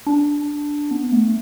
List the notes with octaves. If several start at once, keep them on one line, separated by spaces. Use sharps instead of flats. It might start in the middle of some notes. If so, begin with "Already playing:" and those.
D4
B3
A3